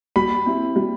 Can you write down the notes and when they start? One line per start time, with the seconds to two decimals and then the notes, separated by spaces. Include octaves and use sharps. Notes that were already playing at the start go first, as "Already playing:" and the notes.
0.16 G3 B5
0.46 C4 E4
0.76 G3